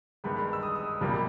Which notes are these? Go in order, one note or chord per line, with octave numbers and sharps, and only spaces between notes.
G1 G2 D#3 G#3 B5
E6
D#6
D#6
B1 A#2 G3 A#3 B5